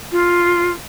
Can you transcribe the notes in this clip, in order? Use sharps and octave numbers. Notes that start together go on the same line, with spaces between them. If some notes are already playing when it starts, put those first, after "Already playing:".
F4